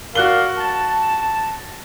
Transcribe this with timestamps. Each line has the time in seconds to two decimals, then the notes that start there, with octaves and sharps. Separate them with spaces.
0.15 F#4 A#4 D5 F5 F#6 G7
0.58 A5